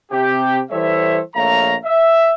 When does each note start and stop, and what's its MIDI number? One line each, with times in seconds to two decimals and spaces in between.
0.11 0.59 48
0.11 0.59 67
0.70 1.19 52
0.70 1.19 55
0.70 1.19 69
0.70 1.19 72
0.70 1.19 73
0.70 1.19 76
1.35 1.74 34
1.35 1.74 57
1.35 1.74 73
1.35 1.74 77
1.35 1.74 82
1.85 2.33 76